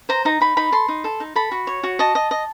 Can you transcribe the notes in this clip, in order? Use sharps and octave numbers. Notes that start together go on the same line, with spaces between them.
C5 A#5
D#4 A#5
D#4 B5
D#4 B5
A4 C6
D#4
A4
D#4
A4 B5
F#4
C#5
F#4
D#5 A5
D#5
D#5